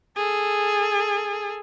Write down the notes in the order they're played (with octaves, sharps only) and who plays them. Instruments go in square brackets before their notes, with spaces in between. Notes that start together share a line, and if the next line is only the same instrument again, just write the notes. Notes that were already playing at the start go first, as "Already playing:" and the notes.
[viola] G#4 A4